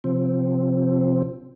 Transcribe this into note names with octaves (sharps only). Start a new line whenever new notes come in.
C3 F3 C4